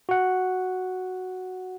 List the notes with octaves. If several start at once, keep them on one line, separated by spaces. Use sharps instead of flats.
F#4 F#5